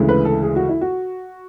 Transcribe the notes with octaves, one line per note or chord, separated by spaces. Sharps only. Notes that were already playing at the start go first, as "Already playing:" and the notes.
Already playing: D2 C#3 E3 G#3
B4
A4
G#4
F#4
E4
F#4